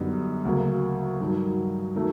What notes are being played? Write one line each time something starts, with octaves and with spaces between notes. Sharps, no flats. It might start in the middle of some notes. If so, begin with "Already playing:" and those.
Already playing: F#2 D3 G3 B3 D#4
D2 C#3 F#3 A#3
G2 D#3 F#3
D#3 F#3 A3